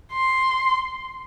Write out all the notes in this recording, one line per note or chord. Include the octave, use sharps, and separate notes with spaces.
C6